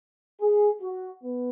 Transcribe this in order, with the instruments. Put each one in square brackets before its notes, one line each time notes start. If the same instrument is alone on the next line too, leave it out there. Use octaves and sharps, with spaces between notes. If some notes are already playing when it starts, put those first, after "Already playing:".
[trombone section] G#4
F#4
B3